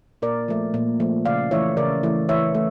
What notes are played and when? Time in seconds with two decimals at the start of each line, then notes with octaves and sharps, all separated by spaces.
0.22 A#2 A#4 D5
0.48 F3 A3
0.74 A#2
1.00 F3 A3
1.26 C#3 D5 F5
1.51 E3 A3 C#5 E5
1.77 C#3 A#4 D5
2.03 E3 A3
2.29 E3 C#5 E5
2.54 A3